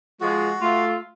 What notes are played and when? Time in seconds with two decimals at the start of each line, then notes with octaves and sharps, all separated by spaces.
0.21 F3 G#3 F#4
0.61 A3 F4